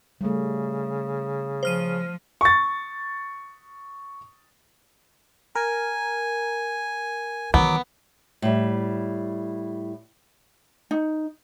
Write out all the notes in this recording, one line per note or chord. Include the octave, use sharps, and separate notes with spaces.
C#3 G3 A3
F3 C5 F6 D#7
C#6 A6
A#4 G#5
D#3 E3 F#3 B3 D6
A2 G3
D#4